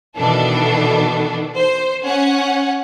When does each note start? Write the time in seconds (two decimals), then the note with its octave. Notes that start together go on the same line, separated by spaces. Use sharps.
0.17 B2 D#3 E3 D4 A4
1.56 C5
2.03 C#4 F#5